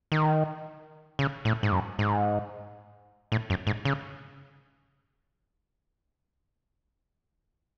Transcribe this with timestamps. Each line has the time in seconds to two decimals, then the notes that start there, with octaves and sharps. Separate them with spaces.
0.12 D#3
1.19 C#3
1.45 A2
1.63 G#2
1.72 F#2
1.99 G#2
3.32 A2
3.50 F#2
3.67 G#2
3.85 C#3